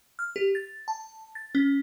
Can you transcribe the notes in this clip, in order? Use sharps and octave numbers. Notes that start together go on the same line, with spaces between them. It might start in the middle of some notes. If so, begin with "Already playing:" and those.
F6
G4
A6
A5
A6
C#4